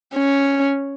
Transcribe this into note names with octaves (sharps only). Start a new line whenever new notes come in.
C#4